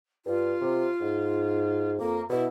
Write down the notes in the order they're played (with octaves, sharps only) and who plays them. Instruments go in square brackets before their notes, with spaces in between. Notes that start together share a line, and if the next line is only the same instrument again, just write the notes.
[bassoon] G2 [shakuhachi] F4
[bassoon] C3
G#2
[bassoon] F2 [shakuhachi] A#3
[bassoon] B2 [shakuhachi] E4